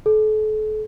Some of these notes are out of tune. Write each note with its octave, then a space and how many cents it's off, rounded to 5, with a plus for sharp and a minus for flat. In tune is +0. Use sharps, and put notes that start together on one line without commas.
A4 -40